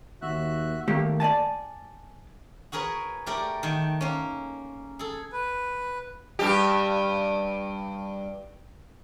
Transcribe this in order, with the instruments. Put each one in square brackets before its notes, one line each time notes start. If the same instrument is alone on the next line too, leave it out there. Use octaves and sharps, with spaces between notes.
[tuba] D#2 [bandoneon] F#4 E5 F#6
[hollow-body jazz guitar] D#3 A3 A#3 G4
D5 D#5 G#5 A5
[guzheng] F#4 G#4 A#4 B4 C#5
A3 G4 A#4 D5
D#3 F#5 G5
A#3 C#4
G#4 A4
[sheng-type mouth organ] B4
[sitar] G2 G4